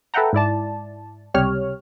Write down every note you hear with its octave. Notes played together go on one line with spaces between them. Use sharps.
A4 B4 E5 F#5 G5 A#5
G#2 E4 D5 A5
C#2 C3 G3 G4 C#5 F6